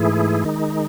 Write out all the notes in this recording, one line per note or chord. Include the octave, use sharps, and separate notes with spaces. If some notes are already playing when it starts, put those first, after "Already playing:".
Already playing: G#2 E3 A3 E4 G#4
D#3 G#3 D#4